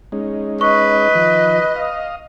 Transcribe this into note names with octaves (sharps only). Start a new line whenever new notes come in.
G#3 C#4 D#4
B4 D#5 C#6
D#3 F3
F5 D#6